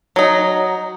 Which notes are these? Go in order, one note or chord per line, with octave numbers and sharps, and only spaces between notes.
F#3 D#4